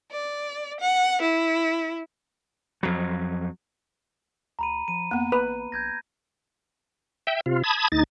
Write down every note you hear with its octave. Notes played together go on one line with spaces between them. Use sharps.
D5
F#5
E4
F2 F#3
D2 A#5 B5 D#7
F3 D#7
F2 A#3 B3
A1 B4
A#1 G6 G#6 A#6
E5 G5
C3 F4
A5 B5 D#6 G#6
D2 D#4 A6